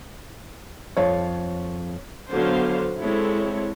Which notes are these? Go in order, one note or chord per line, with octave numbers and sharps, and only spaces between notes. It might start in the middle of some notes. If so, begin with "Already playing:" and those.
F2 F4 C#5
D3 F#3 B3 C5 F5
G#3 C4 E4 A4 C#5